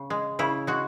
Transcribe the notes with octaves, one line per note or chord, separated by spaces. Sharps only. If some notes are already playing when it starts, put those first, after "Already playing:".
Already playing: C#3
G#3
C#3 E4
G#3 F#4